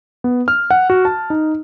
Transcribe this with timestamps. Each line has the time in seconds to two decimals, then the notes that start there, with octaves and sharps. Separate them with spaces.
0.24 B3
0.48 F6
0.71 F#5
0.90 F#4
1.05 A5
1.30 D#4